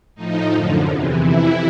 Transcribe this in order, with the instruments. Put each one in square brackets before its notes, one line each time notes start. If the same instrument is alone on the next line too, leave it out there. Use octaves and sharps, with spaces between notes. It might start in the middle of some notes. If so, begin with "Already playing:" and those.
[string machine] A2 F3 D#4
F#2 D3 F3
E2 C3 E3
F2 C3 E3 E4